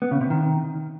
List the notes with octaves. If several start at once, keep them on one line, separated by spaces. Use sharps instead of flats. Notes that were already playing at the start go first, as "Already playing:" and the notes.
B3
C#3
C3
D#3